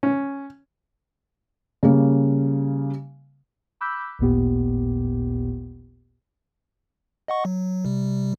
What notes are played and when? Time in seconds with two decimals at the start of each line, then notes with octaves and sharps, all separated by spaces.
0.03 C#4
1.83 C#3 G3 A#3 C#4
3.81 B5 D6 E6 F#6 G6 B6
4.19 A1 D#2 A#2 B3 G4
7.28 D#5 F#5 C#6
7.45 F#3
7.85 C3 G3